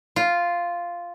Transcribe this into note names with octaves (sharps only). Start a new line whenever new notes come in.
F4